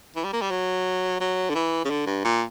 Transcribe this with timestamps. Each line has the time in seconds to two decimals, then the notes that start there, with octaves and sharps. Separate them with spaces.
0.16 E3
0.24 G3
0.33 A#3
0.42 G3
0.51 F#3
1.20 F#3
1.50 D3
1.55 E3
1.85 C#3
1.90 D3
2.06 G2
2.25 A#2